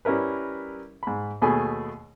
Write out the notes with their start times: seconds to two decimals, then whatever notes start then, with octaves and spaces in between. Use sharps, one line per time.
0.05 G3 C#4 E4 A#4 B4
1.03 G#2 B5
1.41 D#2 B2 A3 G#4 G#5 B5